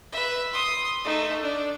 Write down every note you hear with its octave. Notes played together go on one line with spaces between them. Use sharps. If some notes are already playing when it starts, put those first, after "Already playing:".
B4 E5
C6 D#6
A3 D#4
D4